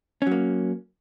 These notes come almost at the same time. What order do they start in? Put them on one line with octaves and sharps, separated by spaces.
C#4 F#3 A#3